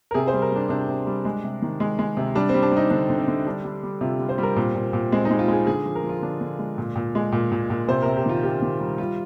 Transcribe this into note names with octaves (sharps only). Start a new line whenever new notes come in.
A#4
C3 G#4
C5
G3
A#4
G3 D4
C3 D4
C3
G3
G#3
C3
D#3
G#3
G#3
C3
G3 D4
C4
G3
D4
G3 D#4
D3 D4
D3
C4
D3
G3 D4
G3
G3
C3 F4
G3
C5
G3 A#4
A#2 C4
A#2
A#2
G#3 C4
D#4
G#3
F4
G#3 G#4
D3 G#4
F3
A#4
F3
F4
D3 D4
D3
G#3
A#2
A#2
G#3
A#2
A#2
A#2
C3 C5
C3 A#4
G4
D#3 F4
C3 G4
D#3
G3
G3 F4